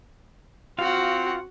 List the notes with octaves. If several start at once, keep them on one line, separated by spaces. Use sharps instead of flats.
C4 F4 F#4 F5 F#5